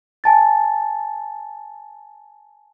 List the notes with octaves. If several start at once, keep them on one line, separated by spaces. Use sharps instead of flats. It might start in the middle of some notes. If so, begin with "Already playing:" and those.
G#5 A5 A6